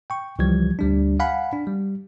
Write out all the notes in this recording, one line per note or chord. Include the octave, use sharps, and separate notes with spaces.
G5 C#6
C#2 E3 F3 G3 G#6
D2 G3 D4
F5 F#5 G#5 B5
D4
G3